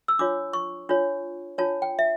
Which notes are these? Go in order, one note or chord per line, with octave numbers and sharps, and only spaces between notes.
E6
D4 F4 C#5 D6
C#6
D4 F4 C#5
D4 F4 C#5 A5
G5
E5